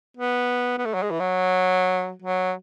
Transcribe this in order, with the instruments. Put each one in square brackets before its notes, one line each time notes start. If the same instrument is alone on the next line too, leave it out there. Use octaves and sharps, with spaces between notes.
[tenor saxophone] B3
B3
A3
F#3
G#3
E3
F#3
F#3